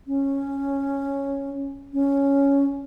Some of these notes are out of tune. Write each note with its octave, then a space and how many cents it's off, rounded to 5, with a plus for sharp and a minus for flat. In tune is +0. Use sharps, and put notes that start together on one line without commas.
C#4 -5
C#4 +5